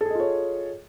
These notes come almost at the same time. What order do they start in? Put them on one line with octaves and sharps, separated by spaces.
A4 G#4 D#5 F4 C#5